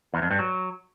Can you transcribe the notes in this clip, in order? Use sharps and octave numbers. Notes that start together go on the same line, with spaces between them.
E2
F2
G2
F#3